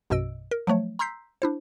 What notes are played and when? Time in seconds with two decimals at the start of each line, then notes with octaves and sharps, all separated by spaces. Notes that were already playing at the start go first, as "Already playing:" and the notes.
0.10 A#1 F#2 B2 D#5 E6 D7
0.51 A#4
0.67 F3 F#3 A3 C#5
0.99 A#5 C6 E6 G6 B6 C7
1.42 D4 E4 C5